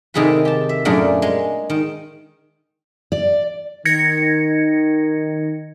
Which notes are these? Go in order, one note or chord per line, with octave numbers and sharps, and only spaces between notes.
C3 D#3 C4 G#4 A4 B4
G4 A5
E5
F#2 A#2 A3 D4 G#4 A#4
G#3
D#3
D5
D#3 G#6 A#6 C#7